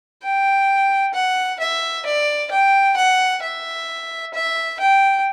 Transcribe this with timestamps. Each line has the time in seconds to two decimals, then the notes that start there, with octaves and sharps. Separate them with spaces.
0.23 G5
1.14 F#5
1.60 E5
2.06 D5
2.51 G5
2.97 F#5
3.42 E5
4.34 E5
4.80 G5